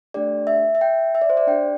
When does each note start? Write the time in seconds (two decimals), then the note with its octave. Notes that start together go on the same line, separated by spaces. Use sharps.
0.14 A3 D4 G4 D5
0.47 E5
0.75 E5
0.81 G5
1.15 E5
1.22 D5
1.30 C5
1.37 D5
1.47 D4 G4 G5